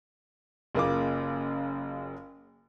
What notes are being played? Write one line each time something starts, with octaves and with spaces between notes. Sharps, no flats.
F#1 C#3 A#3 F4 D6